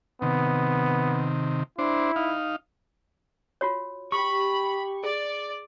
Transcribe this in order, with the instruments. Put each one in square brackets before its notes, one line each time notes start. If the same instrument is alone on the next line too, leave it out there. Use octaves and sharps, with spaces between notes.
[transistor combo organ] C3 D#3 [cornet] B3
[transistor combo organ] D4 C5 [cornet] E4
[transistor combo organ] D#4 F5
[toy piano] F4 F#4 C#5
[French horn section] G4 [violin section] B5 [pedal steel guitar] C#6
[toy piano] G#4 [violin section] D5